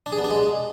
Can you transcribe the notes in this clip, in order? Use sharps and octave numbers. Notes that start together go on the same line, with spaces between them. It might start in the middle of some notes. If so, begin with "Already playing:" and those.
D4
G#4
B3
D4
G#3